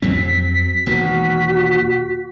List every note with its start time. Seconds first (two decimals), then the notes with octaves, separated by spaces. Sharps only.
0.02 F2 F#3 C4 B6
0.86 E1 D#3 A#3 F#4